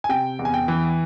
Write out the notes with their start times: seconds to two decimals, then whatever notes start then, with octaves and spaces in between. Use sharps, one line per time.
0.04 G#5
0.09 C3 G5
0.39 E2
0.45 G#5
0.54 G5
0.68 E3